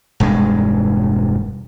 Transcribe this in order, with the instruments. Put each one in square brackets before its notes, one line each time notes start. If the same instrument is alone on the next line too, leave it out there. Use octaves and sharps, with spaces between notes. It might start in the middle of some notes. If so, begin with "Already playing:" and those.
[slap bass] E1 G2 G#3